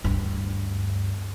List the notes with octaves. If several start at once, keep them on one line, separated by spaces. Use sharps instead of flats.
D2 G2